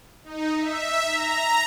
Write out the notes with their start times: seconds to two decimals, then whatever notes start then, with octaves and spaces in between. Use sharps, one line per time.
0.24 D#4
0.58 E5
1.03 A#5